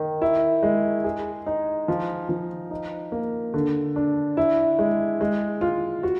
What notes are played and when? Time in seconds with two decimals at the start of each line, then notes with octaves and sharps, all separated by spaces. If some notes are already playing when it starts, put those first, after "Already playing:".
Already playing: D#3
0.22 E4
0.63 G#3
1.04 G#4
1.46 D#4
1.88 F3
2.29 F3
2.71 D#4
3.12 A#3
3.54 D3
3.96 D4
4.37 E4
4.79 G#3
5.21 G#3
5.61 F4
6.03 F#4